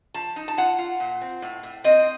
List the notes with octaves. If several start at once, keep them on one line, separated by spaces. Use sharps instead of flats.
F3 A5
D#4
A5
F4 F#5
F4
A#2
C4
A2
A2
C4 D#5